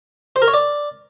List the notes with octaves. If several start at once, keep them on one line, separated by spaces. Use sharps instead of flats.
C5
A#4
C#5
D5